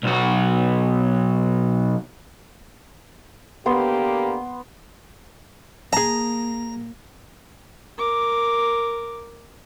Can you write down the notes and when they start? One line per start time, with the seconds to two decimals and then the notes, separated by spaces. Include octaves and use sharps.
0.03 B1 F#4
3.66 D3 A#3 B3 G4 C6
5.93 A#3 G#4 A5 A#5
7.98 A#4 D6